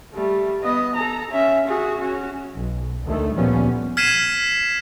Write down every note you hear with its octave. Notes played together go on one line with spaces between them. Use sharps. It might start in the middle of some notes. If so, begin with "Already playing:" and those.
G3 A3
B3 D#5
A4 A#5
C#4 E5
F#4 G#4
C#4 F#4
B1
D2 D#3 A3
D2 A#2 F3 G3 B3 C#4
F6 G#6 B6 C7 D#7 E7